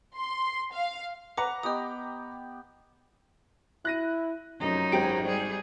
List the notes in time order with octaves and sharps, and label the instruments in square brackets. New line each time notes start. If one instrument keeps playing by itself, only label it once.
[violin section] C6
F5
[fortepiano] B4 F#5 A#5 [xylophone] D6
[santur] B3 G4 G5 [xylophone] D#5 D#6
[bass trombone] E4 [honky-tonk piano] F#6 A#6 D#7
[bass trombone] F1 [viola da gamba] F#2 D#4
[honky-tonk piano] G#1 G4 D7 [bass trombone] G#2
[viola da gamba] G3 G#4